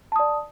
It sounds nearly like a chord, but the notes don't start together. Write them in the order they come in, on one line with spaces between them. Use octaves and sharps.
A5 D#6 D5